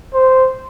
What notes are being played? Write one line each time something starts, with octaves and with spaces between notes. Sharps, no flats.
C5